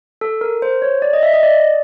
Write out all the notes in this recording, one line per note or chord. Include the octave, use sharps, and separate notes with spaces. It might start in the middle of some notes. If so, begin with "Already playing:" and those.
A4
A#4
C5
C#5
D5
D#5
E5
D#5
D5